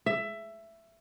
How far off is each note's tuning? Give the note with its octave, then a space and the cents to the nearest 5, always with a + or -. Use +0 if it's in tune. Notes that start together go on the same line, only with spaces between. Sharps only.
E5 +15